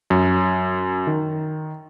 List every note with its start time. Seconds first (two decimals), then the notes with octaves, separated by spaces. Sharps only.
0.10 F#2
1.07 D#3